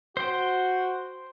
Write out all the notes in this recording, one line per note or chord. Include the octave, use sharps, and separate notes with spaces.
F#4 C5 G5